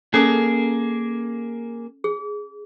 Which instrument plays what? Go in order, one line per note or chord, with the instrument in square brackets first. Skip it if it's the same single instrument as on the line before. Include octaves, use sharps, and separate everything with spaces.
[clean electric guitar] A#3 G#4 [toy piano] C#4 A4 A5
[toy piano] G#4